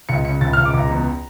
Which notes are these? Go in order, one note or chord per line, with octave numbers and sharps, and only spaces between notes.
C#2 C#7
C#3 C#7
C#2 A6
F6
C#2
D6
C#2 A#5
E2